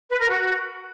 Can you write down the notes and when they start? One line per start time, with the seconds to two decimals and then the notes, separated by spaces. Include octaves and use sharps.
0.11 B4
0.20 A#4
0.29 F#4